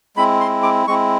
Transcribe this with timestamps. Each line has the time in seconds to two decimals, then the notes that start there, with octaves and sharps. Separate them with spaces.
0.16 G#3 C4 E4 B5
0.40 C6
0.63 D6
0.87 G#3 C4 E4 C#6